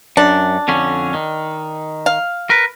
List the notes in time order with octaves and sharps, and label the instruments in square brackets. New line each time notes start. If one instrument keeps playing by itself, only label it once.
[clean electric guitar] F#2 [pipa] D4
[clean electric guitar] F2 D3 C#4
D#3
[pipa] F5
[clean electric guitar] A#4 B4